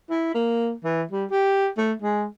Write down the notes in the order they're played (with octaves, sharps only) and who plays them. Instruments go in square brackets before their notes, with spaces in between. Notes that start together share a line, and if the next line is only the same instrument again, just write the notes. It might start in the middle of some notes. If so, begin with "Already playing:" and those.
[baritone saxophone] E4
A#3
E3
G3
G4
A3
G#3